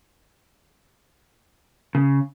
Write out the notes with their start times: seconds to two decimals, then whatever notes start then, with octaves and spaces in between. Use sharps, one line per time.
1.95 C#3